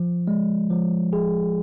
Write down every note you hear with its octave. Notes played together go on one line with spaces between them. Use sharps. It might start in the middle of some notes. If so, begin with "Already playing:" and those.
Already playing: F3
G#3
F3
G#4